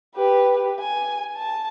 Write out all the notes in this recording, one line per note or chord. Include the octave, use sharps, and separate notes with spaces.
G4 B4
G#5
A5